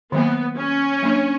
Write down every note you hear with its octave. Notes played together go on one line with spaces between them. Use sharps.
D#3 F#3 A#3 B3
C#4
F#3 A#3 D4